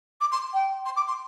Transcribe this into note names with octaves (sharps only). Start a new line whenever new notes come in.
D6
C6
G5
C6
D6
C6